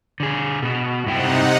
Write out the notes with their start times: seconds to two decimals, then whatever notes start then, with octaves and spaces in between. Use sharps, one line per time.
0.20 D3 G#4
0.62 B2 F#4
1.06 G2 C3 D#4 E4 F#5 G5